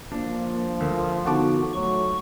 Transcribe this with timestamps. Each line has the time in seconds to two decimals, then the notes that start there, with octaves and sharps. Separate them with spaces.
0.12 F3 A#3 D4
0.80 D2 A#4
1.26 D3 B3 D#4 F#4 F#5 A5 D6
1.74 F#3 A3 C#6